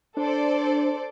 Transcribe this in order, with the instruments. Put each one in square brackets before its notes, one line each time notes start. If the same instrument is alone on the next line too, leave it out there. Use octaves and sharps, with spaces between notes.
[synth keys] D4 [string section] A4 C5 D5